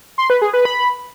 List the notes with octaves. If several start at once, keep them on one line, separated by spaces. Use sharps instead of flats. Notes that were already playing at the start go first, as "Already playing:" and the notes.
C6
B4
G#4
B4
B5